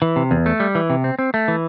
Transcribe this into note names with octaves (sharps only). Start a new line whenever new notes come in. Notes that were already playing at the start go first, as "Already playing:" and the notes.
E3
C3
E2
A3
G3
E3
C3
C4
C4
A3
E3